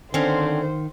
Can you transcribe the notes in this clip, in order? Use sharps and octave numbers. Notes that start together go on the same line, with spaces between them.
D3 D#3 C4 C#4 C5 F5